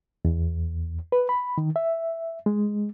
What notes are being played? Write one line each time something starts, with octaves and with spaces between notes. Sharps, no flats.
E2
B4
B5
D#3
E5
G#3